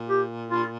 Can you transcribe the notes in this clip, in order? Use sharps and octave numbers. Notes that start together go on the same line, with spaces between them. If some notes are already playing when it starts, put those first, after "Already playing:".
Already playing: A#2
G4
F4